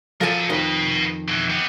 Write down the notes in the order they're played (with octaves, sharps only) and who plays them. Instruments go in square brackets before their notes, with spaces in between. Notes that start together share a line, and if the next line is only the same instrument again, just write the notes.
[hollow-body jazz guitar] F3 A4 A5 [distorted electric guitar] A#4 G#5
[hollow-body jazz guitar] F2 D#3 [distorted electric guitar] B4 D#5
[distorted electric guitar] B2 E3
B3 G4